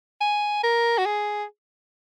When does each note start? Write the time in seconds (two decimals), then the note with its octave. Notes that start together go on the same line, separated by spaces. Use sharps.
0.21 G#5
0.64 A#4
0.98 F#4
1.06 G#4